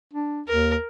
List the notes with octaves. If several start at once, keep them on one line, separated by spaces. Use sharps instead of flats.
D4
D#2 A#4